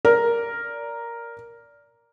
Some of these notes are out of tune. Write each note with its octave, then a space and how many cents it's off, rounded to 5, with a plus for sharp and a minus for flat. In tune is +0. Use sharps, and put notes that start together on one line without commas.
A#4 +0 D5 -15